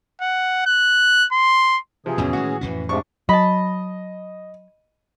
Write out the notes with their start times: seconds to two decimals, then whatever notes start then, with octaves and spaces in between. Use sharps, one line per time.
0.21 F#5
0.66 F#6
1.32 C6
2.06 C3 E3 F3 G#4
2.18 D#2 G#2 B2 D#3 C#4
2.33 A2 D#3 G#3 F#4
2.61 F2 A2 E3 C#4
2.89 G#2 C3 F3 D4 C#6
3.29 F#3 D#5 A5 B5